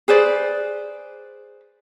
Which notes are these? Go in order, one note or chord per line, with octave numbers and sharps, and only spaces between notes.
G#4 B4 C5 D5